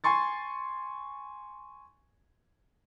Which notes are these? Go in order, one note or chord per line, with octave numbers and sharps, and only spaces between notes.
G#5 C6 C#6 A6